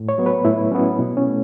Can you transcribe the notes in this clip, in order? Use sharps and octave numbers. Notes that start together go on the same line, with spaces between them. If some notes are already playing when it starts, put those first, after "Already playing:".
Already playing: A2
C#5
F#3 B3
B4
A2 E4
F#3 B3 C#4
B2
C#4
A3